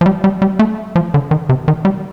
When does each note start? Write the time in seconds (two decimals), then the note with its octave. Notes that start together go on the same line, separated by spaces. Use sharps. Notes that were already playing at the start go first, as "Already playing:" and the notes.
0.01 F3
0.06 G3
0.24 G3
0.42 G3
0.59 A3
0.96 F3
1.14 D3
1.31 D#3
1.49 C3
1.68 D#3
1.85 G3